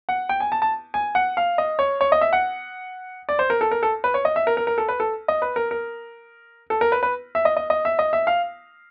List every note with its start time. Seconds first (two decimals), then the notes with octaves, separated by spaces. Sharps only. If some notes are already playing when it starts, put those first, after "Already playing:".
0.09 F#5
0.29 G5
0.40 G#5
0.52 A5
0.62 A5
0.94 G#5
1.15 F#5
1.37 F5
1.58 D#5
1.79 C#5
2.01 C#5
2.12 D#5
2.21 E5
2.33 F#5
3.29 D5
3.39 C5
3.50 A#4
3.61 A4
3.71 A#4
3.83 A4
4.04 B4
4.14 C#5
4.25 D#5
4.36 E5
4.47 A#4
4.57 A#4
4.67 A#4
4.78 A4
4.89 B4
5.00 A4
5.28 D#5
5.42 B4
5.56 A#4
5.71 A#4
6.70 A4
6.81 A#4
6.92 B4
7.03 B4
7.35 E5
7.45 D#5
7.57 D#5
7.70 D#5
7.85 E5
7.99 D#5
8.13 E5
8.27 F5